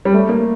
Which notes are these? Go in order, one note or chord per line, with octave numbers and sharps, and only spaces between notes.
G3
A3
A#3